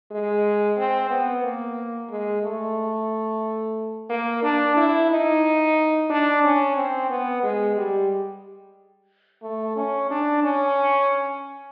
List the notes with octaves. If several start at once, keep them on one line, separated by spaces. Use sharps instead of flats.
G#3
C4
B3
A#3
G#3
A3
A#3
D4
E4
D#4
D4
C#4
C4
B3
G#3
G3
A3
C#4
D4
C#4